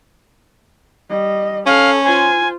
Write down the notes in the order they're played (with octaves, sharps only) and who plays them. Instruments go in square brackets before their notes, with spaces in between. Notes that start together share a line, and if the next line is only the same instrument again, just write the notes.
[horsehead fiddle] G3 D#5
[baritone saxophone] C#4 [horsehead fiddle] A4 [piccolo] F5
[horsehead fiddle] F4 C5 [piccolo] G#5